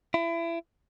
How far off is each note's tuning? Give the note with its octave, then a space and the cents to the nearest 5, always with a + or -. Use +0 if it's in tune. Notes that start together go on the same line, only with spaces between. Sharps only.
E4 +30